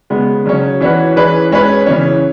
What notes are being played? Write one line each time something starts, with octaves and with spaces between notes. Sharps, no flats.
C#3 G#3 B3
C#3 F#3 C#4
E3 C#4 F#4 B4
E3 C#4 G#4 B4
G#3 C#4 G#4 B4
C#3 E3 C#4